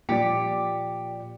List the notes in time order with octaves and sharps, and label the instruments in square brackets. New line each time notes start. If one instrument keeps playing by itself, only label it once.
[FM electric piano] A#2 D5 [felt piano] F3 C#7 [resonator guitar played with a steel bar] G4